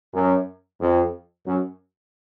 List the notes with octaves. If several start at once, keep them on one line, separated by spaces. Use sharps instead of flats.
F#2
F2
F#2